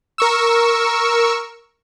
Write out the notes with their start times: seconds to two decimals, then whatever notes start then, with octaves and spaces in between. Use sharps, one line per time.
0.18 A#4 C#6 E6